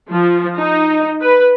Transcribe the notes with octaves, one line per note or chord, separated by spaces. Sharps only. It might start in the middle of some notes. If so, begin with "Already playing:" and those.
F3
D#4
B4